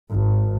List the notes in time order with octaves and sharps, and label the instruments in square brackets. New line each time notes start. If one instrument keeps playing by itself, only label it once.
[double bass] G#1